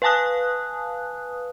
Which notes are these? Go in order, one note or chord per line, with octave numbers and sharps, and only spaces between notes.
B4 F5 G#5 A5 D#6 F#6